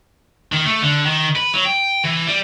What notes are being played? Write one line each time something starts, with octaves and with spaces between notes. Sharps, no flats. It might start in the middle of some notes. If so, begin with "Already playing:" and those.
D#3
A3
D3
D#3
B4
F#3
G5
E3
G3